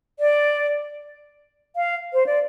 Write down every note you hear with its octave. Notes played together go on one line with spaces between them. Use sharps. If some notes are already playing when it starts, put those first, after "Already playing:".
D5
F5
C5
D5